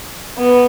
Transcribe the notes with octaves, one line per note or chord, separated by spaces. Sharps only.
B3